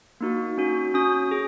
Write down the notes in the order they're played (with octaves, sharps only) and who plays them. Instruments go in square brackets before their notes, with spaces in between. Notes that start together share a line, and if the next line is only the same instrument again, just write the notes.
[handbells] A#3 D#4 F#4
C#4 F#4
C#4 F#4 D#6
G#4